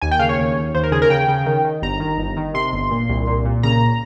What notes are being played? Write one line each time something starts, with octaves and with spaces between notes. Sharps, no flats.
D#2 G#5
G5
C#3 F5
C#5
D#2
D#2
D#2 C5
A#4
C#3 G#4
A#4
C#3 G5
C#3
D#3
D#3
G1 A#5
D#3
G1
D#3
C3 C6
G1
A#2
C2
A#2
A#2
C#3 A#5